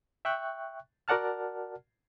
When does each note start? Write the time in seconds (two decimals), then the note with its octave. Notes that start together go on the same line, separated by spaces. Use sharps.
0.25 E5 G5 C#6 F#6
1.08 F#4 A#4 D5 F#5 A5 F6